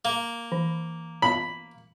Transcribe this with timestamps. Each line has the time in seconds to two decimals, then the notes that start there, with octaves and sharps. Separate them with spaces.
0.05 A#3
0.52 E3
1.22 B5